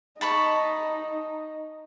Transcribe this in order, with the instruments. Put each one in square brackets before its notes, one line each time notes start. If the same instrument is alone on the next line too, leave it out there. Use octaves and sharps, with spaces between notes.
[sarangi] D#4 [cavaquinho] A5 B5 C#6